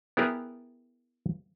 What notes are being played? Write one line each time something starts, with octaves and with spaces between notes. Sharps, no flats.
B3 E4 G4 G#4 A#4